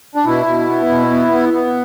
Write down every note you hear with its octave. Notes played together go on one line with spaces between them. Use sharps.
D4
B2 E4
B2
B3
B2
B3
B3
B3